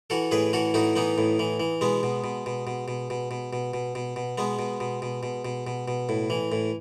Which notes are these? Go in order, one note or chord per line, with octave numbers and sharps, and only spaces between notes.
E3 F#4 A4
A2 G#4 B4
E3 F#4 A4
A2 D#4 F#4
E3 B3 D#4
A2
E3
E3
B2 G#3 B3
B2
B2
B2
B2
B2
B2
B2
B2
B2
B2
B2
B2 G#3 B3
B2
B2
B2
B2
B2
B2
B2
A2
E3
A2